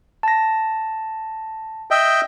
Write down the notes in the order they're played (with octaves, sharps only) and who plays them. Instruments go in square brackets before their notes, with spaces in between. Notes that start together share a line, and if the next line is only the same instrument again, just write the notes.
[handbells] A5 A#6
[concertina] D#5 E5 G5